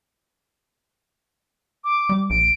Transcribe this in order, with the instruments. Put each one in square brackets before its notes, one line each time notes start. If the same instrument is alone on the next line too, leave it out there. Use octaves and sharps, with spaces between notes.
[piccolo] D6
[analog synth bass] G3
[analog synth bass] A#1 [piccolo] D7